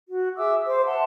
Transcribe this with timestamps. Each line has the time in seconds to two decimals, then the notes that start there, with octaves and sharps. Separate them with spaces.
0.08 F#4
0.36 G#4 E5 D6 E6
0.66 C5 D6
0.86 E5 F#5 A5 C6